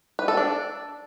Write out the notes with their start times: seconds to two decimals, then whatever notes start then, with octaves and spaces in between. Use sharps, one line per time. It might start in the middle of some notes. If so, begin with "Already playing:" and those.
0.19 B4
0.28 A4
0.37 D4